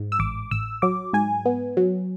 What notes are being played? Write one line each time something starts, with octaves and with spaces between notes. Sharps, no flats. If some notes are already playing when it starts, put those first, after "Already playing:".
Already playing: G#2
E6
A1 D6
A1 E6
F#3 D6
G#2 G#5
B3
F#3